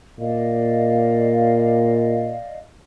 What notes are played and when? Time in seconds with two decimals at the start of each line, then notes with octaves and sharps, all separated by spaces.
0.19 A#2 D5 D#5 F5